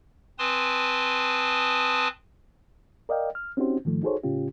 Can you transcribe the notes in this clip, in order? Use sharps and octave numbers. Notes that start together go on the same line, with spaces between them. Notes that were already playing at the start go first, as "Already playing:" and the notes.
C4 B4 G#5 A5 C6 D#6
A#4 D5 D#5 F5 G5
F6
C4 C#4 D#4 F#4 G4 C5
G#2 D#3 F3 A3
D#4 F#4 G#4 A4 C5 C#5
A2 C#3 C#4 F4 G4